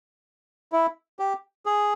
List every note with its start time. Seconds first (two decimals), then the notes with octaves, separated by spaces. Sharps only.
0.73 E4
1.19 G4
1.66 G#4